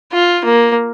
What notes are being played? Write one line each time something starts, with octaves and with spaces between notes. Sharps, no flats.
F4
A#3